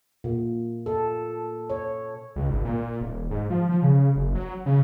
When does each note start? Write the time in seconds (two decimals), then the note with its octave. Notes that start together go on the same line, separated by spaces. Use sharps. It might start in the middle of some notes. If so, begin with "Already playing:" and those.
0.24 A#2
0.86 A4
1.70 C#5
2.36 C#2
2.50 G#1
2.65 A#2
3.01 D#1
3.30 G#2
3.50 F3
3.69 F3
3.82 C#3
4.16 F#1
4.35 F#3
4.66 C#3